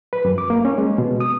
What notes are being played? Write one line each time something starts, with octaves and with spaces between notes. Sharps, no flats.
B4
F#2
D6
A#3
C#4
G#3
B2
D#6